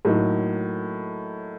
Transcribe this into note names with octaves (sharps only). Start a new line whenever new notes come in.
A2 F#3 A#3 D#4